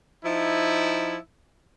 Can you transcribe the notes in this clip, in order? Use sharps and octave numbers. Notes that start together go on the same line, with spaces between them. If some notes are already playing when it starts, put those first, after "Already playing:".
F3 D#4 E4